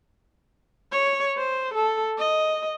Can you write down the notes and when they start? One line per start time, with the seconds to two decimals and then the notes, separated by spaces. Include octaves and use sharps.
0.92 C#5
1.37 C5
1.74 A4
2.19 D#5